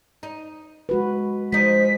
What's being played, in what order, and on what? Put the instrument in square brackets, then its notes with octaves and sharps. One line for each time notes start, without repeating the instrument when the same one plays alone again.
[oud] D#4
[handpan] G#3 F#4 B4
[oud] F3 D#4 [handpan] G#3 [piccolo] B6